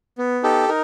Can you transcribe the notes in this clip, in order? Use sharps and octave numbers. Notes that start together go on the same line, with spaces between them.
B3
D#4 G4 A4
D#4 A#4